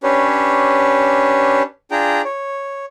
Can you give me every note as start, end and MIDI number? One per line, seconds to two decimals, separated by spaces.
0.03 1.62 61
0.03 1.62 62
0.03 1.62 67
0.03 1.62 71
0.03 1.62 73
1.91 2.22 62
1.91 2.22 65
1.91 2.22 68
1.91 2.22 79
1.91 2.22 82
2.25 2.85 73